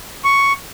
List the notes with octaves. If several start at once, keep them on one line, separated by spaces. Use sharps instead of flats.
C#6